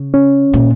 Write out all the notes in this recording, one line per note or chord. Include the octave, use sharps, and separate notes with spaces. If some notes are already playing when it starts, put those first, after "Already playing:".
Already playing: C#3
C#4
A#2